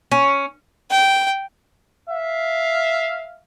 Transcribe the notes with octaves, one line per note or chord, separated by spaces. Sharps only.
C#4
G5
E5 F5